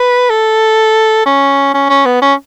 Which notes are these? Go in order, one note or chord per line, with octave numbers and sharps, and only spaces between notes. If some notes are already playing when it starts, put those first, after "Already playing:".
Already playing: B4
A4
C#4
C#4
C#4
B3
C#4